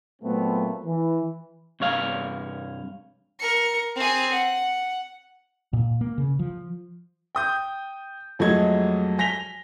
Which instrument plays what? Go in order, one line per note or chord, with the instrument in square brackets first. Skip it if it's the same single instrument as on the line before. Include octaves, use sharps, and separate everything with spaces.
[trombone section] A#2 F#3 A3 B3 C4
E3
[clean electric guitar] C2 G2 C#5 F5
[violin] A#4 C#7
C4 G#4
F#5
[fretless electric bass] A#2
A#3
C#3
F3
[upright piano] G5 D#6 G6
F2 F#3 G#3 A3 D#5 G#6
G#5 A#6 B6 F7 G7